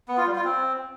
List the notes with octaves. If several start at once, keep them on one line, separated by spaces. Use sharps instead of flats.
B3
F4
G3
F4
C4